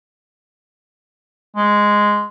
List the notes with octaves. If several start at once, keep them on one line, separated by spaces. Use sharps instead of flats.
G#3